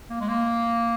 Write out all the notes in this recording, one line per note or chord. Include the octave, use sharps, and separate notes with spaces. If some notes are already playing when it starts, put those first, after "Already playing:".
A#3
G#3
A#3